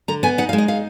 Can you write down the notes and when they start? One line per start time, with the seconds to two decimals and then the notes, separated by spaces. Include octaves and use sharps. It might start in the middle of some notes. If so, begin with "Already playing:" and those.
0.08 D3 A#5
0.23 B3 G#5
0.38 D#4 F#5
0.49 F5
0.53 G#3
0.58 D#5
0.68 D#4 F5